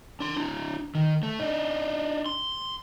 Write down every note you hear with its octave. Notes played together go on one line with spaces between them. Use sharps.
D4 C6
D4 E4
D#3
A3
D4 D#4
C6